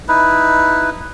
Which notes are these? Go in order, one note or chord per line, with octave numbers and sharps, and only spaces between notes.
D#4 E4 B4